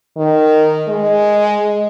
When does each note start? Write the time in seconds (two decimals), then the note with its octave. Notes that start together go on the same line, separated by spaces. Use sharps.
0.17 D#3
0.88 G#3